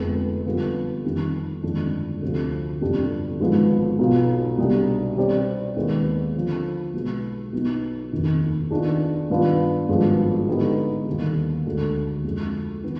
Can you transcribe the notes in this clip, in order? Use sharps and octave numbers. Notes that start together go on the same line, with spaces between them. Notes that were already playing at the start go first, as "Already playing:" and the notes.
Already playing: F1 F2 D3 G#3 B3
F2 D3 G3 B3 F4
F2 D#3 G3
G1 F2 D#3 G#3 D4
D2 C3 F3 C4
G1 F2 C3 G3 D4
G#1 G#2 F3 G#3 B3
B1 B2 B3 F4
C2 B2 G3 D4 G4
B2 G3 C4 G4 D5
D#2 D#3 G#3 B3
D3 F3 C4
B1 B2 G#3 B3
B1 B2 B3 D#4
F1 D#2 D#3
D#3 B3 D4 F4 G#4
G2 D#3 B3 D4 F4
G#1 G2 F3 G#3 B3
D3 G#3 B3 D#4 G4
D#2 D3 G3
D2 D3 G#3
F2 D3 G#3
D#3 B3